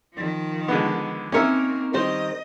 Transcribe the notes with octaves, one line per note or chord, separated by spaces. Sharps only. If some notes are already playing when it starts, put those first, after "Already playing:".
D#3 F3
D3 G#3 B3
A#3 C4 C#4 D#4 A#4 C#5 E5
D#3 G3 C5 D#5